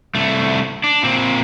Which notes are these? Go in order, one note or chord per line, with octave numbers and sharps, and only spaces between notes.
C2 A3
D4
A#2 C4